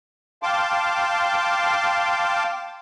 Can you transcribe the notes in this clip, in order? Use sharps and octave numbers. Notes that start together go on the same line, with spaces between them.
F5 G5 A5 C6 D6